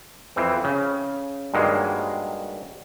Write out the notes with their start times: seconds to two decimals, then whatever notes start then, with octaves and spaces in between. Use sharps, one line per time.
0.36 F2 E3 C4
0.64 C#3
1.54 G2 D#3 F#3 G#3 A#3